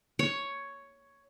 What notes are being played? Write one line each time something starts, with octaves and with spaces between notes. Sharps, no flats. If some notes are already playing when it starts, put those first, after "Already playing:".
C#5